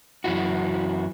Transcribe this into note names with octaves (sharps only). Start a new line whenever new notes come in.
F#2 E3 E4 F#4